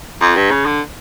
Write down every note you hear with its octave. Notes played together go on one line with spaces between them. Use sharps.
F2
G2
C#3
D3